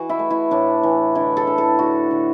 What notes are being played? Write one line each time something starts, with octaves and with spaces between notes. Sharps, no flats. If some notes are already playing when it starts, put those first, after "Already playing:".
Already playing: E3 F#4
E4
A3
E4
A2 D4
E3
D3 E4
A4
D3
A4
D3 F#4
D3